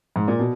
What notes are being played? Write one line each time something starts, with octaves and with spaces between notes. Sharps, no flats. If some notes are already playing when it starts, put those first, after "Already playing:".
G#2
A#2
B2